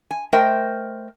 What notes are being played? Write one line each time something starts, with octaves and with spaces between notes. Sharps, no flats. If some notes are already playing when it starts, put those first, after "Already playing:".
G#5
A3 A#4 C5 D#5 G5